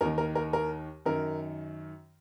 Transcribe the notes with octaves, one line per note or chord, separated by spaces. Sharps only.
D#2 D#3 A#4
A#4
A#4
A#4
F#2 D#3 A#4